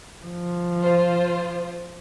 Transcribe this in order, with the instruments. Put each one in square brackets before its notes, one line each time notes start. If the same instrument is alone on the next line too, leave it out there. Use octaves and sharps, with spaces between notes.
[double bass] F3
[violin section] F4 C5